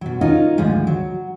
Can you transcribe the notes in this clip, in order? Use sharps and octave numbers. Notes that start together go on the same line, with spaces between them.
B2 F#3
C#4 D#4 F4 A#4 D#5
D2 G#2 F3 G#3 A3
F#3